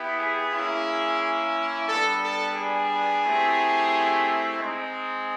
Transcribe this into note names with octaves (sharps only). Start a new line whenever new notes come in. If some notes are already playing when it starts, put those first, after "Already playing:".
Already playing: B3 E4 G4
G#4
A#3 C#4 E4
G3 B3 D4 A4
A4
G#4
A3 C4 E4 G4
G#3 C4 D#4